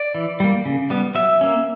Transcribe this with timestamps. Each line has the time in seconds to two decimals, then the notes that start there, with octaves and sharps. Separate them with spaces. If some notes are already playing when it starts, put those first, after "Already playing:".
Already playing: D5
0.15 E3
0.40 G3 A#3
0.65 C#3
0.90 G3 B3
1.15 F#3 E5
1.41 A#3 C#4